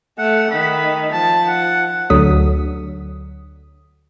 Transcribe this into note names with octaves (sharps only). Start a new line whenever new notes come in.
A3 F#5
D#3 B5
F3 A5
F#5
D2 D3 F#3 D#6 B6